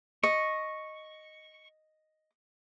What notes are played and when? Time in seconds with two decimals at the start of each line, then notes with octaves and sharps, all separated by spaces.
0.23 D#5 C#6